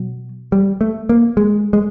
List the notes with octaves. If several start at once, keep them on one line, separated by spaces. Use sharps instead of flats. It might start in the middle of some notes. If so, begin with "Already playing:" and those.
Already playing: B2 F#3
G3
A3
A#3
G#3
G#3